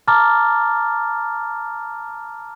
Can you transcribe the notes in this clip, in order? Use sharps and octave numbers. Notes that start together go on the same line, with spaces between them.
A5 A#5 D6 F6 A6